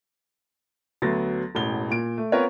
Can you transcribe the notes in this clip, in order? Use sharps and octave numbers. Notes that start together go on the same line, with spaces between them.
D2 F#3 B3 A6 A#6
E1 A1 G7
A#2 D7
A3
B3 C4 F4 A#4 B4 C#5